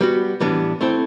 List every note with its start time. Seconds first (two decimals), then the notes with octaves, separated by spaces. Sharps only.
0.01 G3 B3 F#4
0.41 A2 E3 G3 B3 D4
0.81 A3 C4 E4 A4